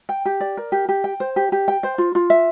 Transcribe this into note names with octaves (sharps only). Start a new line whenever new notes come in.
G5
G4
D5
A#4
G4
G4
G5
C5
G4
G4
G5
C5
F4
F4
E5